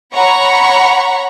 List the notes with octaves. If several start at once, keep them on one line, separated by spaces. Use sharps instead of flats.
C#5 F#5 A#5 B5 C#6